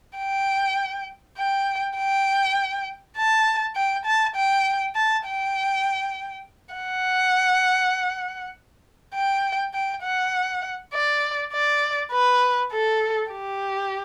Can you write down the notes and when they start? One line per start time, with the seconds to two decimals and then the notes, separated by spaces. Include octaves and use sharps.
0.18 G5
1.37 G5
1.98 G5
3.17 A5
3.76 G5
4.05 A5
4.36 G5
4.95 A5
5.26 G5
6.75 F#5
9.14 G5
9.74 G5
10.03 F#5
10.93 D5
11.53 D5
12.12 B4
12.72 A4
13.31 G4